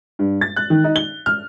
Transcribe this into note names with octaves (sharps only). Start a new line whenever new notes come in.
G2
A6
F#6
D#3
D#4
G7
F6